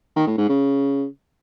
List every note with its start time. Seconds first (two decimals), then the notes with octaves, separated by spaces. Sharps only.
0.16 D#3
0.27 A2
0.38 G#2
0.49 C#3